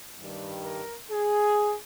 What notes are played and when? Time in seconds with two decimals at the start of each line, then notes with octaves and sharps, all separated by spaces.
0.20 G2 D#3 G3
0.64 A#4
1.10 G#4